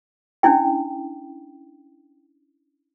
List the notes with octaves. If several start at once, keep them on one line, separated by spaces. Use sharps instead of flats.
C#4 D4 E4 G5